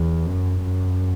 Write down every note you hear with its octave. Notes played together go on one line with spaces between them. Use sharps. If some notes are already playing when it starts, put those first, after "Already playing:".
Already playing: E2
F#2
F#2